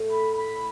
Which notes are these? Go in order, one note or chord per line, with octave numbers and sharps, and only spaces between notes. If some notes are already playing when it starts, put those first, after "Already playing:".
Already playing: A2 A3
B5
B5